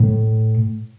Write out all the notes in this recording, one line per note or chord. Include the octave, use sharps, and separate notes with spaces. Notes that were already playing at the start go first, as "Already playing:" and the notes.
Already playing: A2